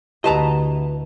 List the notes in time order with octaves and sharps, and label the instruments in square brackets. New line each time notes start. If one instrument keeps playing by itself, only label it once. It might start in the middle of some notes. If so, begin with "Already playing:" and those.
[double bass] D2 [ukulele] E4 A5 A#5 [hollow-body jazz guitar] F#4 B4 D#5 [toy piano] G4